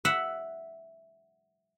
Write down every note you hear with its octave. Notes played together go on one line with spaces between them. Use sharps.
E5 F#5